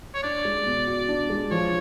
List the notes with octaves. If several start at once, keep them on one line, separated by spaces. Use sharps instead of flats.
C#5
D4 D5
G#3
B2
F#4
D4
G#3
F3 C#5